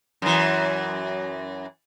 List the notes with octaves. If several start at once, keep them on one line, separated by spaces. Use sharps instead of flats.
F#2 E3